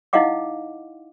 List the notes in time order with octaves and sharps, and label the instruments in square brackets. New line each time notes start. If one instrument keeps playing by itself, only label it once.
[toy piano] D#4 E4 D#5 F5 F#5 D6